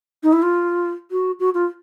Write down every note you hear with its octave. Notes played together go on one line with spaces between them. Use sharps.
D#4
E4
F4
F#4
F#4
F4